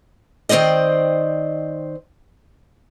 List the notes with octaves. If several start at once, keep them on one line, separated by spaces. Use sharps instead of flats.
D#3 C4 C5 D5 D#5